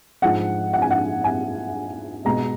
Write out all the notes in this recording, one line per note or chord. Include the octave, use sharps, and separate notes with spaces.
G#2 F3 G#3 F#5
F#5
G#5
F#5
G#5
B2 G#3 A#5